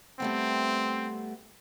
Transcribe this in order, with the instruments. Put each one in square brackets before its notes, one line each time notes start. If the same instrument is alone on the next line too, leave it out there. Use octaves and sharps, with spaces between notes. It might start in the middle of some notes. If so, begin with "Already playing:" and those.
[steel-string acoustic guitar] G3 A3 B3 [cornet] C4